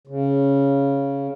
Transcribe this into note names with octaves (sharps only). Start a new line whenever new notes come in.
C#3